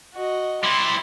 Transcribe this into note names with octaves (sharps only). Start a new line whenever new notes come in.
F#4 D#5
G3 E4 C6